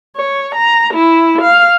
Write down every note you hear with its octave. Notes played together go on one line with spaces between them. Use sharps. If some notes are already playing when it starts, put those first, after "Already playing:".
C#5
A#5
E4
F5